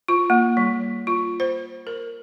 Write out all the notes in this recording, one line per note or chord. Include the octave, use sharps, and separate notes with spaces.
F4
A#3
G3
F4
C5
A#4